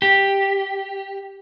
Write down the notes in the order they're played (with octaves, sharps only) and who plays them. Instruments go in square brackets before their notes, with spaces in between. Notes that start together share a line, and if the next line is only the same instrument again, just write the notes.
[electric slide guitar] G4